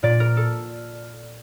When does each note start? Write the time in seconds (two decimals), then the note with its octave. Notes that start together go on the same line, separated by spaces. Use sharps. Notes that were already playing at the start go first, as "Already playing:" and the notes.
0.03 A#2 D5
0.20 A#4
0.37 A4